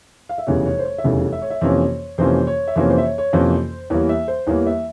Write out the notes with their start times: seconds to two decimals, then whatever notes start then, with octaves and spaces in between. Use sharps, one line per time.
0.29 F5
0.38 E5
0.47 F1 E2 C#3 G3 C#5
0.66 C#5
0.79 C5
0.85 C#5
0.98 E5
1.04 F1 E2 C#3 G3 C#5
1.32 E5
1.42 C#5
1.50 E5
1.61 F2 C3 E3 A#3 C#4 C#5
2.18 F2 C3 E3 A#3 C#4 C5
2.47 C#5
2.68 E5
2.75 F2 C3 E3 A#3 C#4 C#5
2.90 C5
2.98 E5
3.04 C#5
3.18 C#5
3.33 F2 C3 E3 A#3 C#4 C5
3.90 E2 E3 G3 A#3 C#5
4.09 E5
4.28 C5
4.47 E2 E3 G3 A#3 C#5
4.67 E5